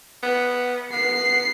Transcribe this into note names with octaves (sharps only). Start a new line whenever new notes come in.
B3
B3 C7